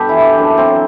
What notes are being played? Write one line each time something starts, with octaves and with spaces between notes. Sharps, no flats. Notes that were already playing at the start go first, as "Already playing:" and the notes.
Already playing: G2 B2 G4 A4 B4
E3 G3 E4
F#2 D4
C4
F#3